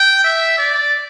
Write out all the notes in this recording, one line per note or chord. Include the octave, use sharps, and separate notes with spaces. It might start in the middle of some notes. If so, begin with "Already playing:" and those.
Already playing: G5
E5
D5